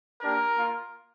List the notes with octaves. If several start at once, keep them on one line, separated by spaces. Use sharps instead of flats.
A#3 D4 G4 A#4
A#3 F4